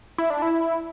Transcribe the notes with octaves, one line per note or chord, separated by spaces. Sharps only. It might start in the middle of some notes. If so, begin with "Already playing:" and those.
E4
D4
E4